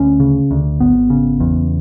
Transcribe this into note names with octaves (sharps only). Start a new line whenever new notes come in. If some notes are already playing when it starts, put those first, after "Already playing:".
Already playing: D2 C#4
C#3
D2
G#1 B3
C#3
E2